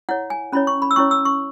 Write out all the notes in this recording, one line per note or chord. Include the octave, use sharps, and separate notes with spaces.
E4 C#5 F#5
G#5
C#4 E4 C#5 B5
C#6
B5
E6
C#4 E4 C#5 C#6
E6
C#6